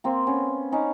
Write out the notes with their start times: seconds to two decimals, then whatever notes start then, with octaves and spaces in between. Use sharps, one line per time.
0.04 A#3 C4
0.27 B3 C#4
0.72 C#4 D#4